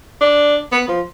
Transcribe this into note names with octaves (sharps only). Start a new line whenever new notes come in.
D4
B3
F3